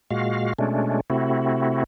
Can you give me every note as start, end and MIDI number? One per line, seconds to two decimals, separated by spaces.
0.11 0.53 46
0.11 0.53 56
0.11 0.53 66
0.11 0.53 77
0.59 1.01 47
0.59 1.01 56
0.59 1.01 57
0.59 1.01 61
0.59 1.01 62
1.10 1.84 48
1.10 1.84 57
1.10 1.84 60
1.10 1.84 64
1.10 1.84 66